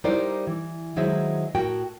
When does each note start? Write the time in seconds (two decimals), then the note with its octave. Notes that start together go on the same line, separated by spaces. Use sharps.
0.04 G3 D#4 E4 A#4 C5 D5
0.47 E3
0.96 D#3 F#3 G#3 E4 C5 E5
1.55 A2 F#4 A#4 G5 A5